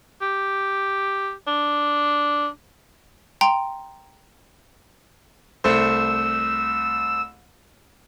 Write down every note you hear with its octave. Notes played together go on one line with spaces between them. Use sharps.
G4
D4
G5 A#5 C6
C2 A3 C5 E6